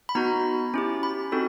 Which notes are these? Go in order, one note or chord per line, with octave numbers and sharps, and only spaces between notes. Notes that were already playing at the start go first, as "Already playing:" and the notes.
B5
B3 D#4 F#4 A#5
C#4 E4 G4
B5
C4 D#4 F#4 A4